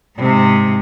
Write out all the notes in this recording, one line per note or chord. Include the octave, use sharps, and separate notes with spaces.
G#2 C3